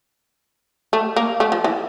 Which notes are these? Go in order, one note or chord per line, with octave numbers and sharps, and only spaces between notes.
A3
A#3
A3
F3
E3